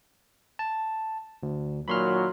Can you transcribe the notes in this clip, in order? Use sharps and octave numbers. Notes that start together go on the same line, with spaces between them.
A5
D2
A#2 D#3 F#3 B5 C6 F6